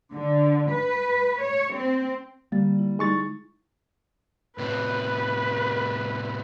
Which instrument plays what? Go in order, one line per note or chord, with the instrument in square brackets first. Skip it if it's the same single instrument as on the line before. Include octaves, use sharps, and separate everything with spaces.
[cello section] D3
B4
C#5
C4
[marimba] D3 A6 [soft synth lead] G3 [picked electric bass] A#3
[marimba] E4
[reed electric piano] G#3 C#6 A6 [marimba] D#4 E4
[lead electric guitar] A2 C3 [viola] B4